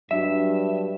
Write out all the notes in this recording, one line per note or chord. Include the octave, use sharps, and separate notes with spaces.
G2 F#3 D4 F#4 E5